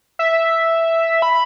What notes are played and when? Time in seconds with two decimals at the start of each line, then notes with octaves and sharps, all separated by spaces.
0.19 E5
1.22 B5